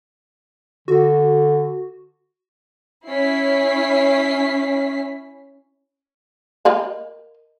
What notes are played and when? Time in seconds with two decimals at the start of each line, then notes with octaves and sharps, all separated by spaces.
0.88 D3 F#4
3.06 C#4 E4 B6 C7
6.65 A#4 D#5 F5